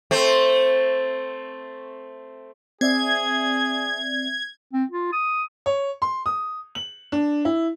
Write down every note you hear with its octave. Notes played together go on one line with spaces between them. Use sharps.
A3 C4
C4 G#4 D5 E5 G#6
C4
F4
D#6
C#5
C6
D#6
F#7
D4
E4